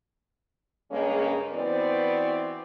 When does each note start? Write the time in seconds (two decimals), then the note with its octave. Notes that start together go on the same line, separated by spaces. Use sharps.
0.91 G2 C#3 G#3 A#3 C#4
1.53 E3 B3 C4 F#4 C5 D5